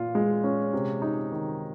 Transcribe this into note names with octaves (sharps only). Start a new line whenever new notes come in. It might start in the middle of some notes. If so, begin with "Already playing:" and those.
Already playing: A#2 F4
G#3
C#4
C3
D#4
D#3